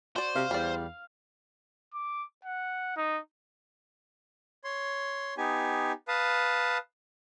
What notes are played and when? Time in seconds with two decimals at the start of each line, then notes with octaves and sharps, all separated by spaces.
0.16 F#4 C5 D5
0.36 C3 F5
0.51 E2 G3 D5
1.94 D6
2.45 F#5
2.97 D#4
4.64 C#5 C6
5.38 B3 D#4 G4 G#5
6.08 B4 F5 A5 D#6